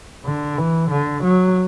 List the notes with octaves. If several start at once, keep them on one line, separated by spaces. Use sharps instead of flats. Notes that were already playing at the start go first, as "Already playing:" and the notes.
D3
E3
D3
F#3